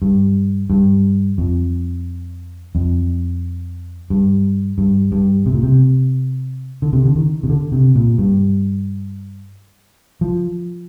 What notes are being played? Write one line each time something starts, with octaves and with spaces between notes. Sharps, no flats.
G2
G2
F2
F2
G2
G2
G2
C3
A#2
C3
D3
C3
D3
D#3
C3
D3
C3
A#2
G2
F3